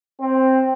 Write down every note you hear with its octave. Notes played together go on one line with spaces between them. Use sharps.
C4